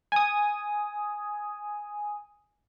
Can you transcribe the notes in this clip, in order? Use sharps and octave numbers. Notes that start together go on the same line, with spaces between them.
G#5 D#6